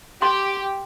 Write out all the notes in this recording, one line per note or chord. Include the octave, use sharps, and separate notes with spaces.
G4 C6